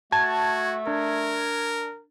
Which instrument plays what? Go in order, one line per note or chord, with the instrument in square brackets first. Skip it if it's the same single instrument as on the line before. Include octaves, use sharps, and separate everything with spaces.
[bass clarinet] A3 [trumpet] F#4 [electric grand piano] A5 [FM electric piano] G#6
[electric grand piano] D4 [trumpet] A#4